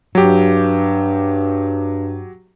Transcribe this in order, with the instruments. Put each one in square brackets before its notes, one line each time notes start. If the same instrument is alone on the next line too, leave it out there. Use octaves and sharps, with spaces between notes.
[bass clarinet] G2 [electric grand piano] F#3 G4